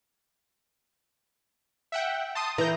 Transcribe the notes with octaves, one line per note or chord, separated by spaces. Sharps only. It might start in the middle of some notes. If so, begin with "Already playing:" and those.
E5 F#5 G5
A5 C6 D#6
E3 A#5 G6